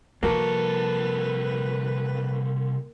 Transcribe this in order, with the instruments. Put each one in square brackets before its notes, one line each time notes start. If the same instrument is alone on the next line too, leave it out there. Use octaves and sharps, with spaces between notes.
[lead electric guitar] C2 A4 [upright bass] F3 [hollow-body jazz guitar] A#3 F#4 [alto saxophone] B4